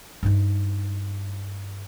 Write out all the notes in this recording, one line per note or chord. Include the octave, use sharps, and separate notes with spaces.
G2 D#4